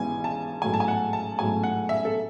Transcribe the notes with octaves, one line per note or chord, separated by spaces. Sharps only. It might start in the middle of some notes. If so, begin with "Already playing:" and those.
Already playing: G#1 G#2 E3 B3 G#5
A5
A1 G#2 F#3 A3 G#5
A5
G#5
F#5
A5
A1 G#2 F#3 A3 G#5
F#5
E5
A4